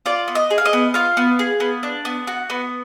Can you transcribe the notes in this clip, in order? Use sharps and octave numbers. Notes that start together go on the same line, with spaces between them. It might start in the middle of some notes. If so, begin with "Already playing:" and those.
F4 D5
B3
D#5
G#4
F5
D#5
B3
F4 F5
B3
G#4
B3
D4
B3
F#4
B3